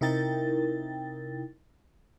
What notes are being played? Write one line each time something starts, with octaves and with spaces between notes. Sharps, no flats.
C3 D#4 E4 A#4 G5 A6